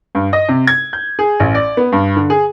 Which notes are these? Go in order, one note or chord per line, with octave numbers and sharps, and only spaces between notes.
G2
D#5
C3
G#6
G6
G#4
A1
D5
B3
G2
D3
G#4